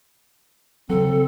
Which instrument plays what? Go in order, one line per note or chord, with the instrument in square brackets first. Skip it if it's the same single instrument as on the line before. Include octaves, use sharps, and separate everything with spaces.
[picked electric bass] C#3 F#3 [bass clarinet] C4 [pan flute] A4